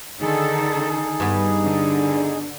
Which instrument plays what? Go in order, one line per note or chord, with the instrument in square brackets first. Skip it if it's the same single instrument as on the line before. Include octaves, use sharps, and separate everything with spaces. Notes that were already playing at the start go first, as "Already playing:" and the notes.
[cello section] D3 D#3 A4 [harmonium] D#4 G#4
[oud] G2 B3
[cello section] D3